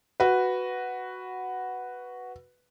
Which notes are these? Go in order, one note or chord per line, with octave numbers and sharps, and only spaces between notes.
F#4 B4